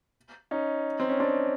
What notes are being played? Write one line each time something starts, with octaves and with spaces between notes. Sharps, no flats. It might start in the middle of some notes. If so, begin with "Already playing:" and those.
C#4 D#4
C4
C#4
C4 D4